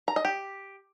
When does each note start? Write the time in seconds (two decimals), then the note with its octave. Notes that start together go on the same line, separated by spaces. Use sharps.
0.08 A#5
0.16 D#5
0.25 G4